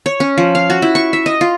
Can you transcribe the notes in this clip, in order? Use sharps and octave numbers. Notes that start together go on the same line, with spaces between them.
C#5
C#4
F3
F5
F#4
E4
C#6
E5
D#5
F4